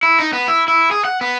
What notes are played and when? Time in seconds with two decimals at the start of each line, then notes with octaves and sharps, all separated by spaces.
0.03 E4
0.19 D#4
0.33 B3
0.48 E4
0.68 E4
0.91 G#4
1.05 F#5
1.21 B3